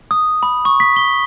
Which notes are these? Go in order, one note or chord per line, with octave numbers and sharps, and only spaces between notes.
D#6
B5
C#6
B6
G7